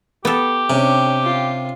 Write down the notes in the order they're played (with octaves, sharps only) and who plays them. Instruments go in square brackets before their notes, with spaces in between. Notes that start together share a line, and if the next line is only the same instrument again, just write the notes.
[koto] B3 A4 [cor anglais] G4
[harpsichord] C3 [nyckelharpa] C#4 D4
[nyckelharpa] F4